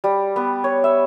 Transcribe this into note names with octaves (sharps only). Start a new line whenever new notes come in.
G3
B3
C#5
E5